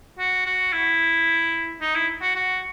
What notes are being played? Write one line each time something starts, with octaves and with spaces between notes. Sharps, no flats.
F#4
F#4
E4
D#4
E4
F#4
F#4